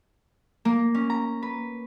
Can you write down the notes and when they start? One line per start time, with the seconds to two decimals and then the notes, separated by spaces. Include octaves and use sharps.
0.65 A#3
0.94 C#4
1.10 A#5
1.43 B4